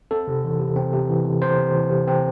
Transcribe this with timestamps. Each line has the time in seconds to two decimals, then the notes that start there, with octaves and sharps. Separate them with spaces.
0.11 C4 A4
0.28 C3
0.44 E3
0.60 C3
0.76 C4
0.93 C3
1.09 E3
1.25 C3
1.42 C4 C5
1.58 C3
1.74 E3
1.90 C3
2.07 C4